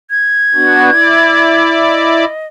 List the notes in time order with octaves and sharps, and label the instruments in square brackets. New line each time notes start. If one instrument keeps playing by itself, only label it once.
[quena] G#6
[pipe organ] B3 D4 F#4
E4 D5
[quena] D#5